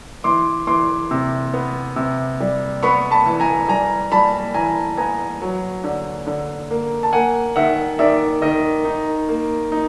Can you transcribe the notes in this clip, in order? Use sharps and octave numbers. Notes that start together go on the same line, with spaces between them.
E3 C6 D6
E3 C6 D6
C3
B3
C3
G3
B3 B5 C#6
A5 B5
E3
G#5 A#5
G3 G#5 A#5
G3 A5 B5
E3 G#5 A#5
B3 G#5 A#5
F#3
D3
D3
A#3
A5
A#3 F#5 G#5
D#3 E5 F#5
D#3 D5 E5
D#3 D#5
D#4
A#3
D#4